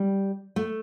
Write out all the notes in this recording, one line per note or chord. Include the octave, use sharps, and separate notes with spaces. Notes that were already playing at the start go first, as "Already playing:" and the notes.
Already playing: G3
A3